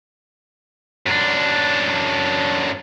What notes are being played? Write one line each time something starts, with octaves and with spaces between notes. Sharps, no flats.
F#2 D4